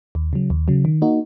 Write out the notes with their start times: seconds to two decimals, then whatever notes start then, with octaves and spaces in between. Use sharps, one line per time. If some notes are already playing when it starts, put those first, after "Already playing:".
0.15 D#2
0.33 C#3 F#3
0.50 D#2
0.68 C#3 F#3
0.85 D#3
1.02 A#3 D#4 F#4